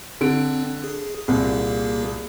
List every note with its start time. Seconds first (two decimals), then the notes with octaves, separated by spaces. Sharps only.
0.21 D3 C4 D7
0.84 G#4
1.28 C2 A#2 A#3 G#4